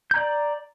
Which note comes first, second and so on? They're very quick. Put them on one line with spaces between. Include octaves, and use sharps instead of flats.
G6 A#5 D5